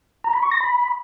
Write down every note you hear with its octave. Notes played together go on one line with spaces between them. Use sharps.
A#5
B5
C#6
A#6
B5